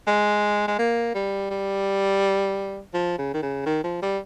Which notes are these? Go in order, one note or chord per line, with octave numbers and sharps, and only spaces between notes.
G#3
G#3
A#3
G3
G3
F3
C#3
D#3
C#3
D#3
F3
G3